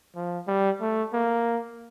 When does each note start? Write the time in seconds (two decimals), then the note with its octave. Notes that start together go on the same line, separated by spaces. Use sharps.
0.16 F3
0.47 G3
0.81 A3
1.13 A#3